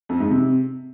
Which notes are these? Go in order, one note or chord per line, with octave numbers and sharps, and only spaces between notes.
F2
G#2
C3